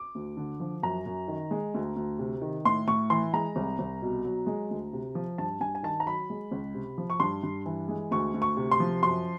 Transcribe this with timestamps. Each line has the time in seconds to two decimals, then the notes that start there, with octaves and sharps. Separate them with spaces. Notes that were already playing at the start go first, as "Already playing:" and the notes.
Already playing: D6
0.15 D2
0.37 D3
0.60 F3
0.83 F#2 A#5
1.06 F#2
1.28 D#3
1.51 G#3
1.74 D2
1.96 D2
2.19 C3
2.42 D#3
2.65 A2 C6
2.88 A2 C#6
3.10 E3 C6
3.33 G#3 A#5
3.56 C2
3.79 C2
4.02 B2
4.25 F#3
4.47 G#3
4.70 D2
4.93 C3
5.15 F3
5.38 G2 A5
5.61 G2 G#5
5.75 G#5
5.83 D#3 A5
6.00 A#5
6.06 F#3 B5
6.30 G#3
6.52 C#2
6.74 C3
6.98 F3
7.10 C#6
7.20 G2 C6
7.43 G2
7.66 E3
7.88 G#3
8.11 D2 C#6
8.34 D2
8.42 C#6
8.57 C3
8.71 C6
8.80 F3
9.03 F#2 C6